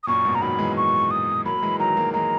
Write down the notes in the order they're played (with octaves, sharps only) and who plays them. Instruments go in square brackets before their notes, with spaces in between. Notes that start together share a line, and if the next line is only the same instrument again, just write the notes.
[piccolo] D#6
[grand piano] F#2 A#2 [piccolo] C#6
[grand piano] G#2 B2
[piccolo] A#5
[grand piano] D#3 F#3 [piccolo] B5
[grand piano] E3 G#3
[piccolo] C#6
D#6
[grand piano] F#3 A#3 [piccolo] B5
[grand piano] A#3
E3 G#3
[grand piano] D#3 F#3 [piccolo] A#5
[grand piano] F#3 A#3
[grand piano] E3 G#3 [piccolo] A#5